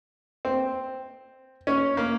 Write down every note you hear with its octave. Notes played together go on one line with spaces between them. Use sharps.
C4
C#4
A#3